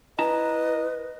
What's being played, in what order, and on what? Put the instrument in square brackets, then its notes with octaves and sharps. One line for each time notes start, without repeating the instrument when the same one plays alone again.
[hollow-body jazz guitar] E4 A5 A#5 [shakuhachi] B4 [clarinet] D#5